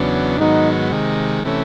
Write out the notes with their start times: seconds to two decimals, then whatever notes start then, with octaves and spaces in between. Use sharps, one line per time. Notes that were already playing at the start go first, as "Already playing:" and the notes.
Already playing: E2 C#3 F#3 B3 D4
0.39 G#2 D#3 F#3 B3 D#4
0.91 C3 D#3 G#3
1.44 C3 E3 A3 C#4